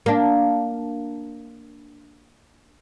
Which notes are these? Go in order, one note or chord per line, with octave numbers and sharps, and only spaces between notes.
A#3 D4